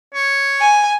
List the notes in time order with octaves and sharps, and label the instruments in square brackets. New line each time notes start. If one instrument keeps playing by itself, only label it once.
[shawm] C#5
[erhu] G#5